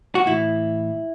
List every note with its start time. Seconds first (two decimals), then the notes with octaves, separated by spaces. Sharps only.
0.15 F#4
0.27 A2 E3 E4